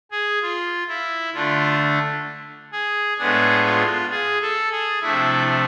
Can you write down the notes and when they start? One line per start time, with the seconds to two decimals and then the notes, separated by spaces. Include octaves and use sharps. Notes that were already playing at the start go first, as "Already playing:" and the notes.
0.11 G#4
0.42 F4
0.88 E4
1.34 D3 A3 D4 F4
2.72 G#4
3.18 A2 G#3 B3 D4 G#4
3.64 F4
4.11 G#4
4.41 A4
4.71 G#4
5.02 C3 F3 A3 D4 E4